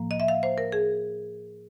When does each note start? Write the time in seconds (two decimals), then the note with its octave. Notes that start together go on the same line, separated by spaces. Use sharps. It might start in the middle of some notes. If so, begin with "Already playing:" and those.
Already playing: A2 F3 A#3
0.11 D#5
0.20 E5
0.28 F5
0.43 C5
0.58 A#4
0.72 G#4